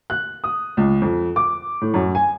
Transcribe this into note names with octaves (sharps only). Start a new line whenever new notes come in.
F#6
D#6
C#2
F2
D6
A2
F#2
G#5